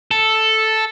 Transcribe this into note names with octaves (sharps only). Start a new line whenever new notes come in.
A4